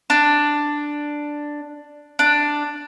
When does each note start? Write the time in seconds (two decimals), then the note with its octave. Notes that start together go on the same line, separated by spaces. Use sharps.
0.10 D4
2.19 D4